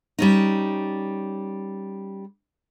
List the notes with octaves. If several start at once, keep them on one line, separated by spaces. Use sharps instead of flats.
G3 C#4 D#4